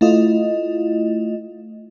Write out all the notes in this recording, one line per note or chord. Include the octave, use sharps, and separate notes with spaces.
A3 E4 F4 D#5